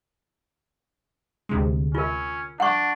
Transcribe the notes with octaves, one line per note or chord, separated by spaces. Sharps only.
D2 C3 G#3
C#4 F4 A#4
D4 F#5 C#6